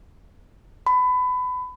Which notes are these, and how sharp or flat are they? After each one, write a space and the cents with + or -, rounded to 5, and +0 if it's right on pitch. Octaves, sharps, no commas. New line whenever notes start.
B5 +25